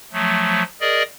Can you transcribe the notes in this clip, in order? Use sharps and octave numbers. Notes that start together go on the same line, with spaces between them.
F3 F#3 A3
G#4 A#4 D5 D#5